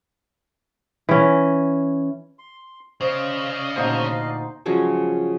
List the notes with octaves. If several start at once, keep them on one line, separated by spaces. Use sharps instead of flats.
E3 C#4
C6
C#3 C5 D5 D#5 F5
D2 A#2 D#4 F#4 C5
C#3 F3 F#3 G#3